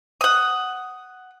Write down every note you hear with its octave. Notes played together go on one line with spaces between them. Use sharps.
F#5 D#6